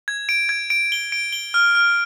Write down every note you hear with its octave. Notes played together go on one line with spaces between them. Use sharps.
G#6
D7
G#6
D7
G7
D7
G7
F6
F6